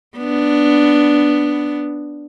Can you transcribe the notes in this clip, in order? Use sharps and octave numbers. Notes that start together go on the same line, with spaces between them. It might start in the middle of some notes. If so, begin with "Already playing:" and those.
B3 D4